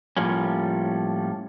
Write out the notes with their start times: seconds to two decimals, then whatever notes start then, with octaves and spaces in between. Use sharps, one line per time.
0.17 A2 F3 G3 A#3 C#4